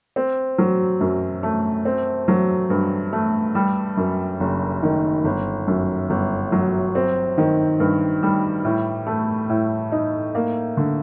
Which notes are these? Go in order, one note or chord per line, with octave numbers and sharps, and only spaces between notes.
C4
F#3
F#2
A3
C4
F#3
G2
A3
G3
F#2
F#1
D#3
G1
F#2
G1
F#3
C4
D#3
G2
G3
A2
A3
A2
D#4
A#3
D3